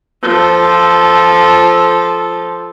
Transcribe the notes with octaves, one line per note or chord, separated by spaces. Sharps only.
F3 A4